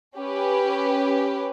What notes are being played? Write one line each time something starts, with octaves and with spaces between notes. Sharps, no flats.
C#4 G4 B4